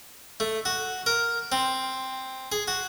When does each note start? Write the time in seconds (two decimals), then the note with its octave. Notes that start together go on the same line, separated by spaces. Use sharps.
0.40 A3
0.65 F#4
1.06 A#4
1.52 C4
2.52 G#4
2.68 F#4